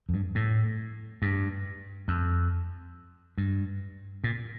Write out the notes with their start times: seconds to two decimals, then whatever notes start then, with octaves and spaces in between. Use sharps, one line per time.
0.09 F2
0.14 G2
0.35 A2
1.22 G2
2.08 F2
3.38 G2
4.24 A#2